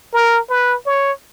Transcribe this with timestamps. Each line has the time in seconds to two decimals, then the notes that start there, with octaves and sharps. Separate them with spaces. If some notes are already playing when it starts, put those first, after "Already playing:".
0.13 A#4
0.49 B4
0.86 C#5